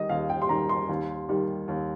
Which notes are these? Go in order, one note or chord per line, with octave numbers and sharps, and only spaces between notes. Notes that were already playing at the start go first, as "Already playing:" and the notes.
Already playing: D#3 G3 D#5
D#2 F5
G5
C6
D#3 G3 A#5
C6
D#2
D#3 G3
D#2